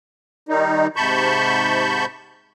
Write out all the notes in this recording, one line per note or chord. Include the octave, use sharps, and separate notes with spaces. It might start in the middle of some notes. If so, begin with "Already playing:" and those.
D#3 G3 D#4
G#2 C3 A5 B5 C#6 G6